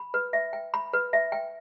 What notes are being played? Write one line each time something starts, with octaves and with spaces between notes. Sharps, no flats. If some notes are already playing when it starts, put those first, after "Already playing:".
Already playing: B5
B4
E5
G5
B5
B4
E5
G5